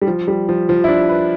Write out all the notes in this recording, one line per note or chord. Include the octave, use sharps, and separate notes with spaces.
G3
F3
G3
F3
F3
E4
D4
B4